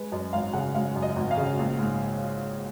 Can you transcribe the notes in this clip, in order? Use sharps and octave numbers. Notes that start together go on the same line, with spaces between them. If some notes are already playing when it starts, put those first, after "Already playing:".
Already playing: G#3 B4
F#2 D#5
G#1 F5
C#3 F#5
G#3 F5
F#2
D#5
G#1
F5
C#3
A#1
G#2